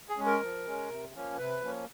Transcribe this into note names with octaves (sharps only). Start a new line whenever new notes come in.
G#4
G#3 C#4
A#4
F3
G#3 C#4
C3
F3 A#3 C#4
C3 B4
F3 A#3 C#4